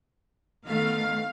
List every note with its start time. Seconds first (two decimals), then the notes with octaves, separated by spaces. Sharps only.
0.66 D#3 A3 B3 F5